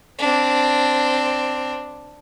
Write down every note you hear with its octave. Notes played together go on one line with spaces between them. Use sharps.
C4 D4